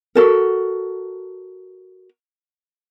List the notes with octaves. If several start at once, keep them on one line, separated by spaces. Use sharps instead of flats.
F#4 A4 A#4